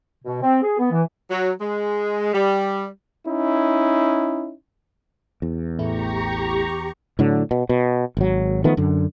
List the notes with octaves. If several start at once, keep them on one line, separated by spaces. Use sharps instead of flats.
B2
C4
G#4
B3
E3
F#3
G#3
G3
C#4 D#4 E4
E2
A1 A3 E4 G4 A#5 C#6
A2 D3 F#3
B2
B2
G#1 F#3
D#3 F3 A3 B3
F#2 D3